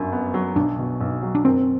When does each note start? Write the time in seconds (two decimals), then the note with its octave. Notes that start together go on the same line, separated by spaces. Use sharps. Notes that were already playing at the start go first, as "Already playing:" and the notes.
Already playing: G1 F#2 D4
0.13 B3
0.34 F#3
0.56 B1 D4
0.78 B2
1.01 B1
1.22 F#3
1.35 D4
1.45 F#1 C4